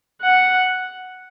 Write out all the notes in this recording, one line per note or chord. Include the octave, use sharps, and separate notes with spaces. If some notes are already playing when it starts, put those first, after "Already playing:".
F#5